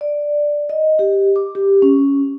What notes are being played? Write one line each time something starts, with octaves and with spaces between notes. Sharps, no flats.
D5
D#5
G4
D6
G4
C#4